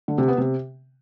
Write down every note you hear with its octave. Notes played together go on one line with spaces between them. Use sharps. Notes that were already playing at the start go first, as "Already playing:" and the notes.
D3
C3
B3
C3